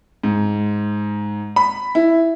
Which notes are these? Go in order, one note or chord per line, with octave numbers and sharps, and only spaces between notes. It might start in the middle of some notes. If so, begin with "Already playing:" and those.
G#2
B5
E4